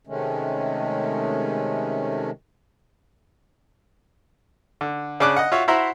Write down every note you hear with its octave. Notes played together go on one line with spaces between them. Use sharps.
C3 D#3 G#3 A3 C#4
D3
C#3 D4 D6 F#6
D#5 F#5
F4 F#4 C#5 E5
E4 F#4 C5 E5 A#5 C6